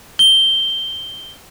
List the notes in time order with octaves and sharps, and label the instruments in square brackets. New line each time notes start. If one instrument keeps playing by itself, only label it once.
[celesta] G7